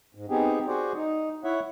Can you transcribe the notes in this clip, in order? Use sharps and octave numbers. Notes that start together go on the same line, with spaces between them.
G#2
B3 C4 D#4 G4 G#4
F#4 G#4 C5 D5
D#4
E4 C#5 E5 F#5